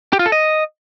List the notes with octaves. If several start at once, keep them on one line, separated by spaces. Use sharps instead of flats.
G4
F4
A4
D#5